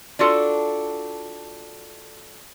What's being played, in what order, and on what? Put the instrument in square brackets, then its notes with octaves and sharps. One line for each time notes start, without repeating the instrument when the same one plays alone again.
[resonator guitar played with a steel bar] D4 F4 F#4 A4